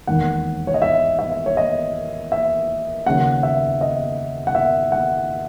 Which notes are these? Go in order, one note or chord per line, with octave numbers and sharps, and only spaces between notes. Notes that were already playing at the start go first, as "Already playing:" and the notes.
E1 D#2 D#3 F#5
C#5
D#5
E5
E5
C#5
D#5
E5
D#2 C#3 F#3 F#5
E5
D#5
F#5
E5
F#5